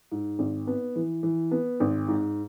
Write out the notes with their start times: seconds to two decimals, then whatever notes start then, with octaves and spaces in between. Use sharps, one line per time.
0.11 G#2
0.39 G#1
0.67 B3
0.95 E3
1.23 E3
1.51 B3
1.80 G#1
2.08 G#2